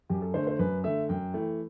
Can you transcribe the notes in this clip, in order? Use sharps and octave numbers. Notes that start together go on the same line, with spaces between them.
F#2 G4
A4
D3 A3 C5
C5
F#2 B4
D3 A3 E5
F#2 G5
E3 A3